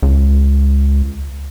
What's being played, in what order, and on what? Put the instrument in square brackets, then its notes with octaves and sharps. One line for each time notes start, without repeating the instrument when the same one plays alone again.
[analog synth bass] C#2